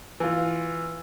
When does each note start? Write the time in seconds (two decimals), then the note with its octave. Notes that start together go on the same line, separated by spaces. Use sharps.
0.20 E3 F4